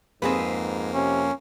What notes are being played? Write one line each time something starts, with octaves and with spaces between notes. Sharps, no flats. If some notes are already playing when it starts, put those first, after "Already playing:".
F2 G#2 A#3 C4 G#4 B4
C3 C#4